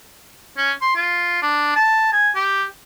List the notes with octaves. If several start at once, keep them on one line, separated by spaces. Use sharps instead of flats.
C#4
C6
F4
D4
A5
G#5
G4